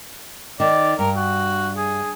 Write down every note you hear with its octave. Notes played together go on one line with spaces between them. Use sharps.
D#3 D5
G2 A#4
F#4
G#4